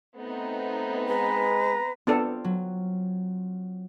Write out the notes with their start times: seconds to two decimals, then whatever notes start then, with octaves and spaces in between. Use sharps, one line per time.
0.17 A3 B3 C4 D#4
1.08 G#3 B4 A#5
2.07 B3 C4 D4 F4 A4
2.44 F#3